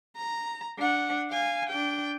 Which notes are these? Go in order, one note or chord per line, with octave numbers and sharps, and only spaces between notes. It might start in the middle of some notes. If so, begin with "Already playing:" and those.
A#5
D4 F#5
F5 G#5
D4 G5